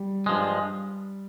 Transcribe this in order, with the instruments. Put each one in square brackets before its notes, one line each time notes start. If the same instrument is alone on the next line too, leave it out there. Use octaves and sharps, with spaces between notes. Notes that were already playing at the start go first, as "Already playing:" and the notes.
Already playing: [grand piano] G3
[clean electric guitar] G2 F3 G#3